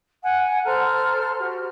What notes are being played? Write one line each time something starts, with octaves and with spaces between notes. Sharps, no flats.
F#5 G#5
A4 C5 A#5 F6
F#4 G4